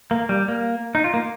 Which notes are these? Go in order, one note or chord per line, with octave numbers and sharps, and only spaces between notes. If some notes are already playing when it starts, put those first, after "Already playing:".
A#3
G3
A#3
D#4
F4
A#3